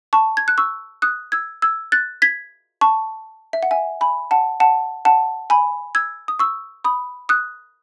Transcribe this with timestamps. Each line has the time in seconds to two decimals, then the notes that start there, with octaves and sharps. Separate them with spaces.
0.13 A5 C#6
0.37 G#6
0.48 F#6
0.58 C#6 E6
1.02 D#6 F#6
1.32 E6 G#6
1.62 E6 G#6
1.92 F#6 A6
2.22 G#6 B6
2.81 A5 C#6
3.53 E5
3.63 F#5
3.71 E5 G#5
4.01 G#5 B5
4.31 F#5 A5
4.60 F#5 A5
5.05 F#5 A5
5.50 G#5 B5
5.95 E6 G#6
6.28 D#6
6.39 C#6 E6
6.84 B5 D#6
7.29 D#6 F#6